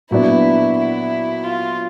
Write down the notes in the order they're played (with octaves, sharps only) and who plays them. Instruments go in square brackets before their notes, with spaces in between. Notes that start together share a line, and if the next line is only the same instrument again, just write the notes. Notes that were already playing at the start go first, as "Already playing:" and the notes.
[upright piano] A#2 F#3 B3 D4 [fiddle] E4
[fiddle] E4
F4